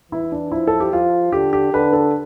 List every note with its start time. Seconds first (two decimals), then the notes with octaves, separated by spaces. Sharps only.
0.11 E3 E4
0.32 D4
0.52 F3 E4
0.67 A4
0.80 G4
0.92 F3 F4
1.32 D3 G4
1.53 G4
1.73 D3 B4
1.93 A4